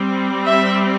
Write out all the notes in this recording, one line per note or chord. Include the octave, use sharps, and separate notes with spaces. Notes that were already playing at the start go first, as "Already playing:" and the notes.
Already playing: G3 C4
E5